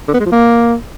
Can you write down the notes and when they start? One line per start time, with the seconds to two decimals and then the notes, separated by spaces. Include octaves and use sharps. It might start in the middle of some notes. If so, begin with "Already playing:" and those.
0.08 D3
0.14 B3
0.20 G#3
0.26 F3
0.32 A#3